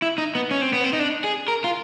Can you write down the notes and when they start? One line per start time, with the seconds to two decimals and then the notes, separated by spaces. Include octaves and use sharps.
0.02 E4
0.18 D#4
0.35 B3
0.51 C#4
0.62 C4
0.73 B3
0.84 C4
0.93 D#4
0.99 D4
1.24 G#4
1.48 A#4
1.64 F4